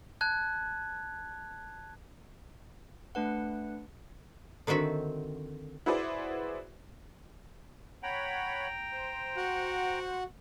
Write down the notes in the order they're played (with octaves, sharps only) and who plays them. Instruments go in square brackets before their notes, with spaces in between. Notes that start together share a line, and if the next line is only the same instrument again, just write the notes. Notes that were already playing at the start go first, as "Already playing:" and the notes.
[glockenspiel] A5 F#6 G#6
[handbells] A3 D4 B4 F#5
[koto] D3 D#3 C4 F#4 E5
[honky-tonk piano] E4 F#4 G#4 B4 C5 D5
[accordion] C#5 F#5 B5 [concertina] G5 A#5
[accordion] C5
[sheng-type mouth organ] F#4 F#5